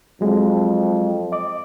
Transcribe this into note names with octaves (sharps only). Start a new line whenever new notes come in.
F2 F#3 G#3
D#5 D6